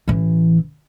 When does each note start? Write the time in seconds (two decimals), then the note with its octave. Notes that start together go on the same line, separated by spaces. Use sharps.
0.08 A1 E3